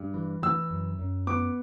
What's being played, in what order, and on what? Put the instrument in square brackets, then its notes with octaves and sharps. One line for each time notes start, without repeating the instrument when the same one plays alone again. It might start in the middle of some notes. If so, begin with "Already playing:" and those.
Already playing: [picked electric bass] G2
E3
[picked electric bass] E3 [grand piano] E6
[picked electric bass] F#2
F#2
[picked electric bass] B3 [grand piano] D6